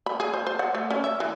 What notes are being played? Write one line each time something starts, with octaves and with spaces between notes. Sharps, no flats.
B5
G#4
C5
C5
F#5
A3
C#4
E5
E3